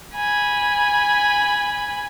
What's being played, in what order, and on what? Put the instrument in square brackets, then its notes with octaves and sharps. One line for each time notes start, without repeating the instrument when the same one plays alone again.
[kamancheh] G#5 B5